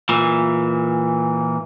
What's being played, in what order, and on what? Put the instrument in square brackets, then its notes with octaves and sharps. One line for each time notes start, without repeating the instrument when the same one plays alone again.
[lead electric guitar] A#2 E3